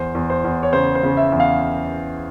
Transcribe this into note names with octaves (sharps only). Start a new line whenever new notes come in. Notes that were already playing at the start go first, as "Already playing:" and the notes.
Already playing: E2 C5
E2
C5
E2
C#5
C#3 C5
C5
C#3
E5
E2
F5